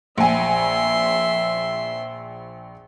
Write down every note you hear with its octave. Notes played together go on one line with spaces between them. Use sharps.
A#1 E5 G#5 C6